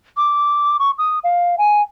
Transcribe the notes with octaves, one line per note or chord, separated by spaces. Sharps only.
D6
C#6
D#6
F5
G#5